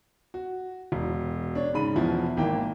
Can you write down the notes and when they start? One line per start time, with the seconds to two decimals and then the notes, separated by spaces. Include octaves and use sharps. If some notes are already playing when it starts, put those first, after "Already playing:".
0.34 F#4
0.92 E1
1.55 D4 C#5
1.74 G#2 C#3 B5 D#7
1.96 E2 B2 F3 E4
2.37 G#1 A#3 E4 G5